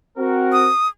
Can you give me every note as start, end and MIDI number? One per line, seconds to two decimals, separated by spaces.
0.18 0.68 60
0.18 0.68 66
0.18 0.68 70
0.52 0.88 87